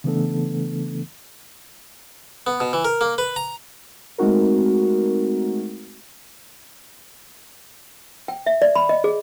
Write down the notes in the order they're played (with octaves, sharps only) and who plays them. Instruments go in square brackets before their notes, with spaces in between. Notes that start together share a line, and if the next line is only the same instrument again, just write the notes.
[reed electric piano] C#3 E3 A3 B3 D4 A4
[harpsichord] B3
B2
E3
A#4
A#3
B4
A#5
[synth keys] G#3 A3 C4 D#4 F#4 A#4
[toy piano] G5
E5
D5
B5
D#5
G#4